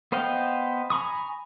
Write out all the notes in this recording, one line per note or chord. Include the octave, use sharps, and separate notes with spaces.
B3 C5 D#5 F5 G5
G#5 A#5 B5 C#6 D#6